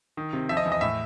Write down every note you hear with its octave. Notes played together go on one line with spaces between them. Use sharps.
D#3
C3
F3 E5
D#5
E2
D#5
A2 E5